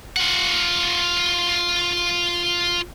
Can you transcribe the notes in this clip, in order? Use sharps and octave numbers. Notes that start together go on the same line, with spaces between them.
F4 F#5